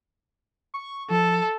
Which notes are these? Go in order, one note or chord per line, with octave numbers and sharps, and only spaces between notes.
C#6
F3 A4